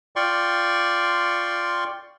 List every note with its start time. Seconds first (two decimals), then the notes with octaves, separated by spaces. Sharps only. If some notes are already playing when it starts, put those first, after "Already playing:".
0.16 F4 D5 G5 C6 C#6